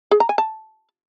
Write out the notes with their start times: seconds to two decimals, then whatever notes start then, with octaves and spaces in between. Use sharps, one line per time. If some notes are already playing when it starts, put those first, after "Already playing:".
0.11 G#4
0.20 A#5
0.29 G#5
0.38 A5